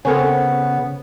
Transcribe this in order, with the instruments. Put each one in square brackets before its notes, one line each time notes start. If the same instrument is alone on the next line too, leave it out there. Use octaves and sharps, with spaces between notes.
[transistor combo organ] C#3 [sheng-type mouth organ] B3 [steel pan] C4 C#5 [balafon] A4 A#4 G#5